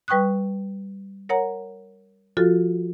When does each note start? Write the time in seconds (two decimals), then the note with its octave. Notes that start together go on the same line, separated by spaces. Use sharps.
0.08 G3 B4 G5 C#6 D#6 F#6
1.29 A#4 C#5 F#5 A#5
2.37 F3 F4 F#4 A4